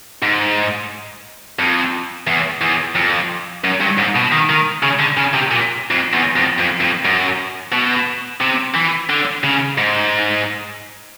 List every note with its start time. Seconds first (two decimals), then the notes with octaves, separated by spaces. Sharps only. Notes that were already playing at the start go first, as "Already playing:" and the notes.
0.22 G#2
1.59 F2
2.27 E2
2.61 E2
2.95 F2
3.64 F#2
3.80 G2
3.98 G#2
4.15 B2
4.32 D#3
4.49 D#3
4.83 C#3
5.00 D3
5.17 C#3
5.34 C3
5.51 A#2
5.91 F2
6.14 E2
6.37 F2
6.59 F2
6.81 F2
7.05 F#2
7.73 B2
8.41 C3
8.75 E3
9.10 D3
9.43 C#3
9.78 G#2